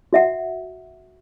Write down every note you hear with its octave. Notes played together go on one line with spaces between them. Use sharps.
F#4 E5 F#5